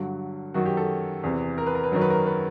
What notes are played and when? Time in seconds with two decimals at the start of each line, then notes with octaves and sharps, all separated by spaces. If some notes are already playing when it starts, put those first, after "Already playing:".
Already playing: G2 D3 F#3
0.54 F#2 D#3 F#3 F#4
0.65 G4
0.77 A4
1.23 E2 C3 E3
1.58 A#4
1.67 B4
1.75 A#4
1.84 B4
1.92 F#2 D#3 F#3 A#4
2.01 B4
2.10 A#4
2.26 B4